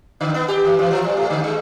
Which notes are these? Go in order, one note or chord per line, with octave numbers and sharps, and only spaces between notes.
D3
B3
G4
E3
E3
F3
G3
A3
D3
G#3